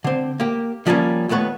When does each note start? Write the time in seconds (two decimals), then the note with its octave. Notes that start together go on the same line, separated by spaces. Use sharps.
0.04 D3 C4
0.40 A#3 G4
0.86 D3 F3 G3 G#3 A#3 C#4
1.29 D#2 A3 B3 B4 C#5